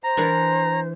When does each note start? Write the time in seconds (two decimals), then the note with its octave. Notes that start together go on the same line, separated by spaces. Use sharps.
0.04 C5 A#5
0.17 E3 D4 A#4